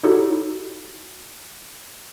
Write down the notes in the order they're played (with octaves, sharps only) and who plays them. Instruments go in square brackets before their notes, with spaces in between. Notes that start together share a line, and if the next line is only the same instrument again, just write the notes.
[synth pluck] D#4 E4 F#4 G4 A4 C#5